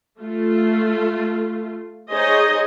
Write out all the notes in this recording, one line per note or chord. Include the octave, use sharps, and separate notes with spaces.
A3 F4
D#4 G#4 C5 C#5 D#5